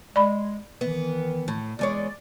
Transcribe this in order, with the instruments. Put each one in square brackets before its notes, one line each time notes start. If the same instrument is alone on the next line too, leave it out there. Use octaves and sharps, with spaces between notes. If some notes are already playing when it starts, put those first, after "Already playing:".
[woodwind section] G#3 [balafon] D5 B5
[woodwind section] D#3 E3 [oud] B3
[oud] A2
[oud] E2 G#3 C#5 [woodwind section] D5